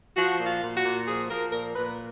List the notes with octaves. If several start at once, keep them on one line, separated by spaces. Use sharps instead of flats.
F3 F#4
A#2
F4
A#2
F#4
A#2
F3 G#4
F3 A#4
A#2 A#4
A#2 B4